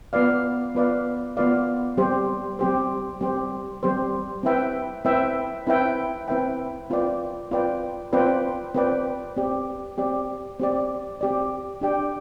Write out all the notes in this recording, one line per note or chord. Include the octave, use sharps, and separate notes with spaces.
B3 F4 B4 D5 F5
B3 F4 B4 D5 F5
B3 F4 B4 D5 F5
G3 C4 G4 C5
G3 C4 G4 C5
G3 C4 G4 C5
G3 C4 G4 C5
C4 E4 B4 E5 G5
C4 E4 B4 E5 G5
C4 E4 B4 E5 G5
C4 E4 B4 E5 G5
C4 F4 B4 D5 G5
C4 F4 B4 D5 G5
C4 F4 B4 D5 G5
C4 F4 B4 D5 G5
C4 G4 D5
C4 G4 D5
C4 G4 D5
C4 G4 D5
D4 G4 D5 G5